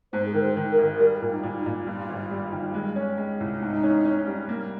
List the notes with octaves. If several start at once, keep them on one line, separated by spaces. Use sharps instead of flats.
G#2 C5
G#4
D#3 A#4
C5
D#3
A#4
G#1
G3 A#4
A#2
D#4
A#2
D#4
A#2
G2 F4
G#1
G3
D#3
G#3
C#4
G#3
C2
F4
G#2 D#4
C#4
C#4
G3
A#3